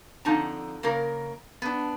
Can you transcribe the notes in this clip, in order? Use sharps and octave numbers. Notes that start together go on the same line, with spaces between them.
F2 D3 D#4 A5 A#5
C#3 A#3 A#4
B3 D4